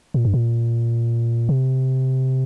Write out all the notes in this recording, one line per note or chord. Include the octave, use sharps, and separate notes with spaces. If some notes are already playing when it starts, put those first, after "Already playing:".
A#2
G2
A#2
C3